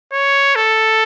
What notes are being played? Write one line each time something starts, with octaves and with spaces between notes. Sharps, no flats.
C#5
A4